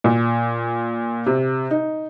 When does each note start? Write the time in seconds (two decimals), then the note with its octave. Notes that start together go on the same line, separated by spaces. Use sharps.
0.04 A#2
1.26 C3
1.71 D#4